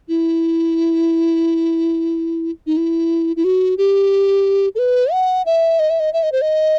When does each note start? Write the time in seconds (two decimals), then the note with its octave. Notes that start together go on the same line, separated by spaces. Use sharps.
0.08 E4
2.67 D#4
2.77 E4
3.36 E4
3.44 F#4
3.78 G4
4.75 A4
4.79 B4
5.12 F#5
5.46 E5
5.79 D#5
5.90 E5
6.00 D#5
6.13 E5
6.23 D#5
6.32 C5
6.42 D#5